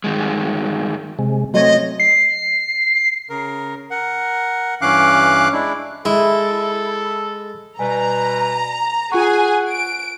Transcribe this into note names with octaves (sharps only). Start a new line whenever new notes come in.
G2 D#3 G#3
C3 G#3
F#3 A3 C4 C#5 D#5
C7
C#3 A#4
A#4 F#5
G2 E3 C#4 F5 D6 F#6
G#3 D4 E4
G#3 E4 A4
B2 G3 B4 G#5 A#5
F4 G#4 F#5 G#5 C#6
D7